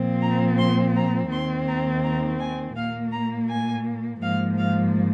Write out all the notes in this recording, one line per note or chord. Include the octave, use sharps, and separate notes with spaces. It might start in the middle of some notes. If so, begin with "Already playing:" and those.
Already playing: A#2 F3 C4
A#5
C6
A#5
D#2 D#3 C4 C6
A#5
A#5
G#5
A#2 A#3 F5
A#5
G#5
G#2 F3 A#3 F5
F5